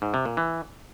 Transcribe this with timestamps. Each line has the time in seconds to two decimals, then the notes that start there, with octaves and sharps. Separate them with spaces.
0.02 G#2
0.14 C3
0.25 A#2
0.37 E3